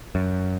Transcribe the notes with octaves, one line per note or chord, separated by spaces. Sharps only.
F#2